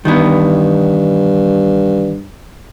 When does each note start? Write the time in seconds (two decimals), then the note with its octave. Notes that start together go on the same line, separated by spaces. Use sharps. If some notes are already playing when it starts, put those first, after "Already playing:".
0.05 G2 D#3 E3 B3